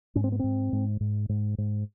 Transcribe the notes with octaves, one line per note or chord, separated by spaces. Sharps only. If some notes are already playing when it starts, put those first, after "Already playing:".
G#2 C#4
C4
B3
G#2 C4
G#2
G#2
G#2
G#2